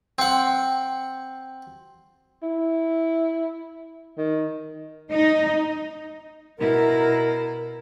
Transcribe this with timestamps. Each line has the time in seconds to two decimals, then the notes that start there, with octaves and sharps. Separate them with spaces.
0.18 C4 F#5
2.43 E4
4.17 D#3
5.11 D#4
6.59 B2 E4 A#4